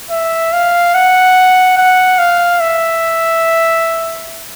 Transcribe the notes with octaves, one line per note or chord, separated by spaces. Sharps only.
E5
F5
F#5
F#5
F5
E5